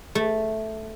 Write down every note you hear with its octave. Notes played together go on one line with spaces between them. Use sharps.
A3